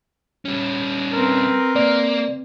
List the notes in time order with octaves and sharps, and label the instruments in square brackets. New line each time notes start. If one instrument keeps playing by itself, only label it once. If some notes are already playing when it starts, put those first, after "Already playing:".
[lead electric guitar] G3 C#4
[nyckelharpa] C4 B4 [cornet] A#4
[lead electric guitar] A#3 [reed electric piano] D5